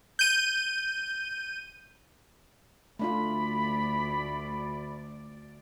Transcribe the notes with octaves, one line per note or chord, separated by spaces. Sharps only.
G6 D#7
D2 A3 D4 F4 D5 B5